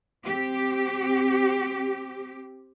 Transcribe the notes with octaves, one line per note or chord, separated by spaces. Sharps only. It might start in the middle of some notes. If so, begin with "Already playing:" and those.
C4 G4